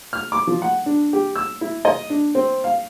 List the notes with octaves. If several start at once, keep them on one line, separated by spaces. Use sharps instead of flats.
F6
D6
F3
F#5
D4
G4
E6
E4
D#5
D4
C4
F5